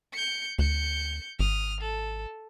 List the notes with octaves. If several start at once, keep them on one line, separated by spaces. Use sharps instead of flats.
G6 C#7
D2 G6 C#7
G#1 D#6 F6
A4